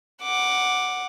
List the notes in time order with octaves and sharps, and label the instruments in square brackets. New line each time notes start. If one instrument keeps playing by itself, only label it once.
[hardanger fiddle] F#5 D6